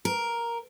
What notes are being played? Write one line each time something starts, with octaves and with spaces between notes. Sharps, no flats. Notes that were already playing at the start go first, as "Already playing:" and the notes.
A#4